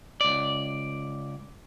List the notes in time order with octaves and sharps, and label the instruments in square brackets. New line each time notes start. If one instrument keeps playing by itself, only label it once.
[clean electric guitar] C#2 D5